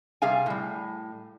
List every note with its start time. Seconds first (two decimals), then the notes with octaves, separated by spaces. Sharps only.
0.22 C3 G3 G#4 F5 G#5
0.46 A2 G3